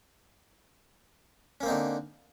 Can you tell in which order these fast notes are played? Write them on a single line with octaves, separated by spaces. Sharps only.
C#4 A#3 C4 D#4 D3